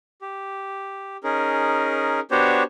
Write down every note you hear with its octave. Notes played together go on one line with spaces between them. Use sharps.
G4
C#4 D#4 G#4 A#4
B3 D4 F#4 G4 C5 C#5